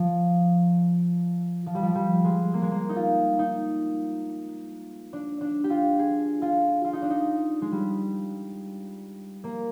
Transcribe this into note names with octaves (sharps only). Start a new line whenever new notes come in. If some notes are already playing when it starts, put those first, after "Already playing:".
Already playing: F3
F3
G3
F3
G3
G#3
A#3
G#3
A#3
D#4
F4
D#4
D4
D4
G4
F4
G#4
F4
F4
D#4
D4
D#4
G#3
G3
A#3